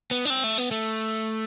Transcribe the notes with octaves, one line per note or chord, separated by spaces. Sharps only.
B3
D4
C4
A3
B3
A3